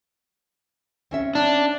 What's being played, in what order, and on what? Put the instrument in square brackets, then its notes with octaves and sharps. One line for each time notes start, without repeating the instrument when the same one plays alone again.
[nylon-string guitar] C4 C#4 E5
[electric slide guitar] D4